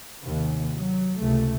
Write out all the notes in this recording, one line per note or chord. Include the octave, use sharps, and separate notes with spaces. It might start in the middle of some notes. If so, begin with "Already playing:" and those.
D#2 C3
F#3
C#2 C3 A3